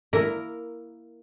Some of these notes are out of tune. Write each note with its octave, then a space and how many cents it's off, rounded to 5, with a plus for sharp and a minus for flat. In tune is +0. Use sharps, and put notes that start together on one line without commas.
A#3 +0 E4 +5 A#4 -5